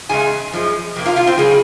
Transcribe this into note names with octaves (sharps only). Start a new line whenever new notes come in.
F2 C#3 G#3 G#4 G#5
F#2 F3 G#3
F2 C3 A#3
F4 F5
F4 F5
C4 C5
C#3 F#3 G#3 G#4